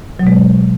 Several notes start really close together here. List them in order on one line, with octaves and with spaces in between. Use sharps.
F#3 B2 G#3